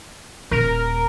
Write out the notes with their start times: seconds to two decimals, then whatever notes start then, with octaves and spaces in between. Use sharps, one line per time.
0.51 D#1 A#4